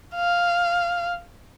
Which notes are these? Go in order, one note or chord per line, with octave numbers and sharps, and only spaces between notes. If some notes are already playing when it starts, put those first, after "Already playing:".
F5